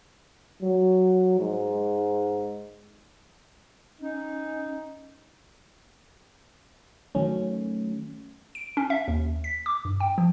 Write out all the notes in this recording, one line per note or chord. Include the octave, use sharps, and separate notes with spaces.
F#3
G#2
C#4 D#4
D#3 F#3 A3 C#4
D7
C#4
E5
D#2
B6
D6
G2
G5
F3